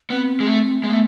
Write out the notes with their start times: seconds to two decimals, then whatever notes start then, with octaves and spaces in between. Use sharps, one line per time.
0.10 B3 C4
0.40 G#3
0.47 A3
0.83 G#3 B3
0.90 A3